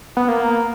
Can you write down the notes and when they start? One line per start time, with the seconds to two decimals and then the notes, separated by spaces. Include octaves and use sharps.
0.17 B3
0.28 A#3